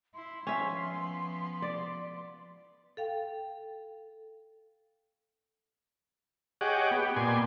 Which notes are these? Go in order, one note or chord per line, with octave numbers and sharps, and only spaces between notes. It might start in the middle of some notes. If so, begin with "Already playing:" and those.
E4 C6
F3 B3 C#4 E5
D5
A4 F5 G5
G4 G#4 C#5 D#5 F#5 D6
B3 G4
A#2 B3 D5 G#5 C6